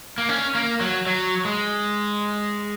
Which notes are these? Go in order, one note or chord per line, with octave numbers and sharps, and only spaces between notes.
A#3
C#4
A#3
F#3
F#3
G#3